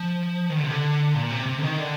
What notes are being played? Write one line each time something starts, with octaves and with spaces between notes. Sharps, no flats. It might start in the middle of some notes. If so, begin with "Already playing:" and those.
Already playing: F3
D#3
D3
C3
D3
A#2
C3
C3
D3
D#3
D3